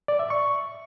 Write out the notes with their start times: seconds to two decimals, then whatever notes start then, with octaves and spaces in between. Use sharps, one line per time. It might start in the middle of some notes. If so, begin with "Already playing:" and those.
0.08 D5
0.19 E5
0.30 C#6